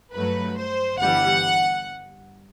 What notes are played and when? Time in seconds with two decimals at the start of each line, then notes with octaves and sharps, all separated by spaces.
0.13 G2 F#3 A3 B4
0.57 C5
0.98 G1 G2 E3 G3 F#5